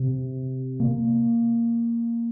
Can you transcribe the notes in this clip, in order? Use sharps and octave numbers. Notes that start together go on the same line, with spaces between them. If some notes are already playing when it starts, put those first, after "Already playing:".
Already playing: C3
A#3